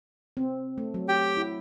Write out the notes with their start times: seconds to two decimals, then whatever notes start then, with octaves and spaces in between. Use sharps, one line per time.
0.37 C4
0.78 A3
0.94 F#3
1.08 G4 G5
1.37 E4